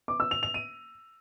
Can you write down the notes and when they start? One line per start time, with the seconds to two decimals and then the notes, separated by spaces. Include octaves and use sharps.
0.08 D6
0.20 E6
0.31 F7
0.43 F7
0.54 D#7